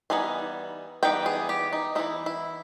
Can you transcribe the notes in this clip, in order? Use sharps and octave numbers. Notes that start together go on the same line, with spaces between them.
E3 G3 B3 D#4 G#5
E3 G3 B3 D#4 G5
G#4
G4
D#4
E3 G3 B3 D#4 E4
E4